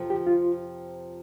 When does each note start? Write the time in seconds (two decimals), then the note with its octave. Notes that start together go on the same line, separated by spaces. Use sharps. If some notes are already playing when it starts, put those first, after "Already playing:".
Already playing: F2 C3 F3
0.10 G4
0.27 F4